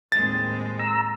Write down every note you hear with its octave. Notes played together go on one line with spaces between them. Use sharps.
D#2 A2 G#3 C4 A6
A#5 E6